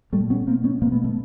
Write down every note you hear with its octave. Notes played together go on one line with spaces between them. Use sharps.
A#2 G3 A3
B3 C#4
B2 A#3 C4
B3 C#4
B2 A#3 C4
A3 B3
A3 B3